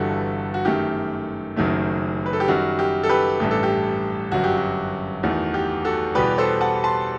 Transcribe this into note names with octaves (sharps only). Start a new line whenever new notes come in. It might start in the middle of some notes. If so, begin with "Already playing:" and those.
Already playing: G1 G2 E3 G3 F#4 A4
F#4
F#2 D#3 A3 G4
F#1 F#2 D#3 F#3 A3
B4
A4
G4
F#2 D#3 G3 F#4
G4
A4
G4 B4
A1 G2 E3 A3 G4
A4
G4
G1 F#2 F#3 F#4
G4
F#4
E2 D#3 A3 F#4
G4
F#4 A4
E2 B2 G3 G4 B4
A4 C5
F#5 A5
A5 C6